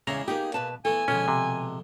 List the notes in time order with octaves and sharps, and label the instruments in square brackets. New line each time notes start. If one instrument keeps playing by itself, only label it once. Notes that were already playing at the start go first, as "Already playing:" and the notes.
[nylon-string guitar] E2 C#3 [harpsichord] G#3 D4 E4 [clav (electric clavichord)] A#5
[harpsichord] A#3 G#4 [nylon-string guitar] B3 D#4 G4
[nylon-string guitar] B2 B4 A5
[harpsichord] E3 A3 B3 [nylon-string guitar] A4 [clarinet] G#5
[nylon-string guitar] B2 [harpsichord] D3 F3 G#3 [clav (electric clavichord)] C#4
[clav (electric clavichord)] C3